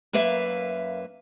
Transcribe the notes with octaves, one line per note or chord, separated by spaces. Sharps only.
F#2 A#3 B4 E5 F5